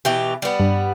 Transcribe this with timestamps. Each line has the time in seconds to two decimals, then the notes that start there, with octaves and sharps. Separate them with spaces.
0.05 B2 E3 G4
0.42 G3 B3
0.60 G2